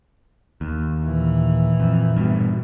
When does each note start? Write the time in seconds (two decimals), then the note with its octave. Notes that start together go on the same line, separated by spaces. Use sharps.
0.61 D#2
1.03 A#2 E3
1.80 F2
2.16 G2 B2